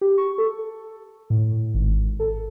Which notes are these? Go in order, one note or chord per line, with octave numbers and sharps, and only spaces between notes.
G4
C#6
A4
A2
G#1
A4